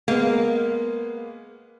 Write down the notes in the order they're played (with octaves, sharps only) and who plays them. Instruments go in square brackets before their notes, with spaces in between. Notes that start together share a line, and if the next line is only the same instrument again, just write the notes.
[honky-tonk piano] G#3 B3 [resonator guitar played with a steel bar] A#3